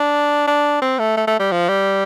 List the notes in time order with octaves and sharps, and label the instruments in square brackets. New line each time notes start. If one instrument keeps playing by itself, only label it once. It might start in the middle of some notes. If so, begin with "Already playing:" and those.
Already playing: [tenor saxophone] D4
D4
C4
A3
A3
A3
G3
F3
G3